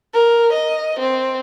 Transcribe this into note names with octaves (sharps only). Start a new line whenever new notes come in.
A#4
D#5
C4